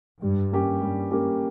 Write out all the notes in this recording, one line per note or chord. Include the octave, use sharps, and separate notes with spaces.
G2 G3
A#3 C#4 G4
G2 G3
A#3 C#4 G4